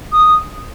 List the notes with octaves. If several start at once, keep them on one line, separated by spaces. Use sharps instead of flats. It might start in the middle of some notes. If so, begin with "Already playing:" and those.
D#6